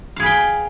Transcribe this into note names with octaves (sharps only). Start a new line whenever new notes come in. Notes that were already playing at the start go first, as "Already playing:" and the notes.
G#4 B4 F5 G5